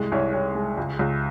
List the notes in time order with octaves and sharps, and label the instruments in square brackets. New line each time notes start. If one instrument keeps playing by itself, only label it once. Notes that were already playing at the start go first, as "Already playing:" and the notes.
Already playing: [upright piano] C2 G#3
C2 C#5
C2 C#5
G#3
C#2
C#2